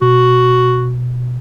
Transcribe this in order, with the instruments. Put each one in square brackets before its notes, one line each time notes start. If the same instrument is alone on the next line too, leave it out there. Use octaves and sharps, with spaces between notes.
[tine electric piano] B2 [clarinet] F#4